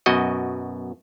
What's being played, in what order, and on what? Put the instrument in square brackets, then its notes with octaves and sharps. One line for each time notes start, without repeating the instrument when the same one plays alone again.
[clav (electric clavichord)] F#2 B2 F#4 D#5